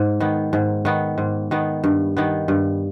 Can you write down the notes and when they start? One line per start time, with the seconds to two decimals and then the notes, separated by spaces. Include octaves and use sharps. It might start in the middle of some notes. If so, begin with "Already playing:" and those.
Already playing: G#2
0.20 D#3 B3
0.53 G#2
0.85 D#3 B3
1.18 G#2
1.51 D#3 B3
1.84 G2
2.17 D#3 B3
2.48 G2